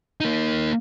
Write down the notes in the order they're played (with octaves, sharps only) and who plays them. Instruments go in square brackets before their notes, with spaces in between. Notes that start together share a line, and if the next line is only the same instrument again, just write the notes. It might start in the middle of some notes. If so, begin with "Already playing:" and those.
[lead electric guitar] A#3 D#4